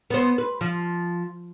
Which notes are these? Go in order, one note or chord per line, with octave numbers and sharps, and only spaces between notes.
B3 C5
B4
F3